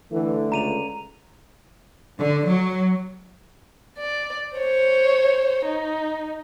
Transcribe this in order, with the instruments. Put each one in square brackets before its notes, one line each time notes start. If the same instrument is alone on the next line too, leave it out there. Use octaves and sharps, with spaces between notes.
[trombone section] D3 [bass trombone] E3 [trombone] A3
[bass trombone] C#2 [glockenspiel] A#5 D#7 F7
[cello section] D3
F#3
[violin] D5
C5 C#5
D#4